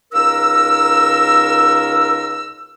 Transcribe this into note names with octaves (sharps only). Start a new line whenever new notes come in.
C#2 A#3 D#4 A#4 E6